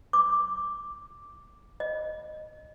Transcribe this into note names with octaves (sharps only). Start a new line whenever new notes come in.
D6
D#5